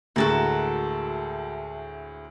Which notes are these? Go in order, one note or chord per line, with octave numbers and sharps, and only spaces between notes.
D2 A2 G#3 F#4 A4 A#4